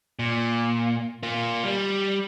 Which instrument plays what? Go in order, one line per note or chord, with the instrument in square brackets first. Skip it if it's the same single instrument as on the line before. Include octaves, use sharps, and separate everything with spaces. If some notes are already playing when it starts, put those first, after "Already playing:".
[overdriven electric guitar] A#2
A#3 F4
G3